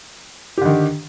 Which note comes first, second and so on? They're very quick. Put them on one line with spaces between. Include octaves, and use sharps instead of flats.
G4 D3 D#3